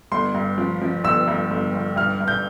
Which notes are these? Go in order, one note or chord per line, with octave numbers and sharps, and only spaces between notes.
G1 C6
G2
F3
F3
G1 E6
G2
G1
G1
G2 F6
G2
G6